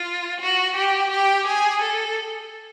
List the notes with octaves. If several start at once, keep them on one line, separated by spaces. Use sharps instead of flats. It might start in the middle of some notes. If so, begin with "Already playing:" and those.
Already playing: F4
F#4
G4
G4
G#4
A4